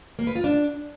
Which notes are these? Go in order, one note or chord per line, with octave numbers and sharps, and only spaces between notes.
A#3
B4
F4
D4